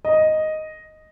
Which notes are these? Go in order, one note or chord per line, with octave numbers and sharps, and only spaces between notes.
D#5